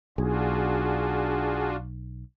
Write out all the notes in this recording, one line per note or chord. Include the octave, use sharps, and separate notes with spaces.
B1 D4 F4 F#4 G#4